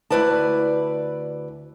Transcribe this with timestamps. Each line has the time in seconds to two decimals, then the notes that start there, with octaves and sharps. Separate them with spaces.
0.10 D2 C#3 E4 B4 D5 A5